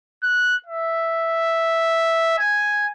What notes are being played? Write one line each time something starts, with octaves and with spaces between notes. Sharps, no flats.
F#6
E5
G#5